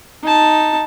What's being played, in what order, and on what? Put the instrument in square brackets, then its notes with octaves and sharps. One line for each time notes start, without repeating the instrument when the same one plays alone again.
[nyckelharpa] D#4 A5